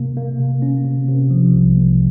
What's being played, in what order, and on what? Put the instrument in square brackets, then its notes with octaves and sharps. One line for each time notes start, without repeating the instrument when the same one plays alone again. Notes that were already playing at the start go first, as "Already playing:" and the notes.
Already playing: [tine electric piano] C3 A#3
A#3
C3
C#4
C3
C3
F3
C2
A#3